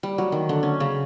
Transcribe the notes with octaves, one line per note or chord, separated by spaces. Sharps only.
G3
F#3
D#3
D3
C#4
C#3